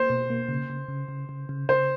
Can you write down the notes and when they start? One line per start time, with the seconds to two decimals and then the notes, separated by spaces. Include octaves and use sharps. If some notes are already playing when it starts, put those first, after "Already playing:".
Already playing: A#3 C5
0.10 B2
0.30 A#3
0.49 C#3
0.70 C#3
0.88 C#3
1.08 C#3
1.29 C#3
1.49 C#3
1.69 C#3 C5